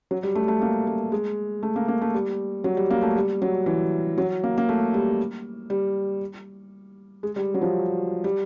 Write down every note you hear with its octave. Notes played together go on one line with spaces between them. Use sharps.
F#3
G3
A3
A3
A#3
A3
G#3
A3
A#3
A#3
A3
G3
F#3
G3
A#3
A3
G3
F#3
E3
F#3
A#3
A#3
A3
G3
G3
G#3
G3
F#3
F3
G3